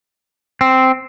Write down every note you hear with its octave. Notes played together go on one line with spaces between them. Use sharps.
C4